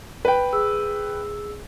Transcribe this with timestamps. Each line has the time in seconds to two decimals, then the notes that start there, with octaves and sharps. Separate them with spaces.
0.25 B4 G5
0.53 G#4 E6